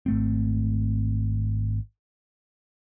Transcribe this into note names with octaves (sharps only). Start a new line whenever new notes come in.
G#1 A3 C4